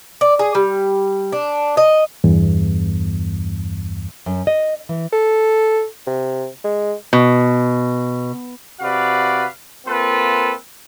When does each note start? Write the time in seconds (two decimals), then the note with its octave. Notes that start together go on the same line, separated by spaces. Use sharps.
0.21 D5
0.39 G#4
0.55 G3
1.32 D4
1.77 D#5
2.24 E2 G2
4.26 F#2
4.47 D#5
4.89 E3
5.13 A4
6.07 C3
6.64 G#3
7.13 B2
8.81 C3 F#4 B4 D5 F5
9.86 A#3 C4 F4 A4 B4